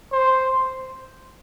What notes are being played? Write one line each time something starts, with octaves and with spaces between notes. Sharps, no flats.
C5